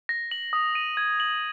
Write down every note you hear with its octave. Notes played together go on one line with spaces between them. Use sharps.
A#6
F#7
D#6
D#7
G#6
F#7